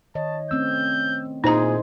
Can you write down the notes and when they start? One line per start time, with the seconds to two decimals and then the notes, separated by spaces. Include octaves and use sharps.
0.15 D#3 C#5 D#5 A5
0.51 A3 C4 C#4 E6 G6
1.44 A#2 D#4 E4 G#4 C5 D#5 G#5 A#5